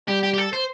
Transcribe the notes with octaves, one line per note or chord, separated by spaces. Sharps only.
G3 G4
G4
G4
A4
C5